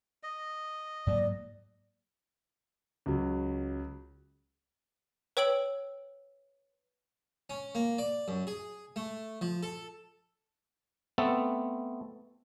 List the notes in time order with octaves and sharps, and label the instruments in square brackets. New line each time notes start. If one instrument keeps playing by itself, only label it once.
[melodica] D#5
[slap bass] G#2 F#3 A#3 [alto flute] D5
[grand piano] C#2 F#3
[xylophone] B4 C#5 G5 E6 D7 F#7
[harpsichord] C#4
A#3
D5
F#2
G#4
A3
F3
A4
[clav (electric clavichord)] A3 B3 C4 A4